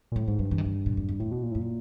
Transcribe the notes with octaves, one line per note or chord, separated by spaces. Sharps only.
A#2
A2 A3
G#2 G#3
G2 F#3
E3
D#3
E3
A#2
F2
E2
F2 A2
B2
A#2
A2
F#2
A#2